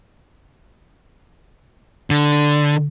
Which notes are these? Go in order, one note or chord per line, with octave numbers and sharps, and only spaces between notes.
D3